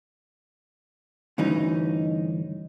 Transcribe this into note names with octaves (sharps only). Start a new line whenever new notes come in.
D2 G2 E3 C#4 D#4 D#5